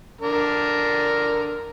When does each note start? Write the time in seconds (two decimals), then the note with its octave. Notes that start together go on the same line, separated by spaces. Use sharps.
0.21 D3 D4 A#4